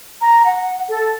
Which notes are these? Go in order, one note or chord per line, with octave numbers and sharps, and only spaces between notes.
A#5
F#5
A4